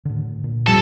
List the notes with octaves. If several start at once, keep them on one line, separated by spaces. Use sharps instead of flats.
A2 D3
A#2
G#1 F2 G3 C4 A4 G#6